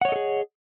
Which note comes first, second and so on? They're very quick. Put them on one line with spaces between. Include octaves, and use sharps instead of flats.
F#5 C#5 D#5 A4 G#4